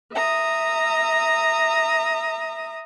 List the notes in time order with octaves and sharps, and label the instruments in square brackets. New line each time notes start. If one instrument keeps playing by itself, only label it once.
[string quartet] E5 A#5 D#6